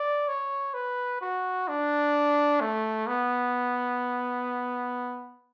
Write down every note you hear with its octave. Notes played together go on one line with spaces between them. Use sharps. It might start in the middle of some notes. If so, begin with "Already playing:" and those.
Already playing: D5
C#5
B4
F#4
D4
A3
B3